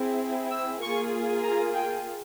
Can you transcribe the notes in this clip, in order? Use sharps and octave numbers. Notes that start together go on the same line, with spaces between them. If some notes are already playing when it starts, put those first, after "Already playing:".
Already playing: C4 E4 G#4
E6
A#3 F4 G#4 C#6
A#5
G5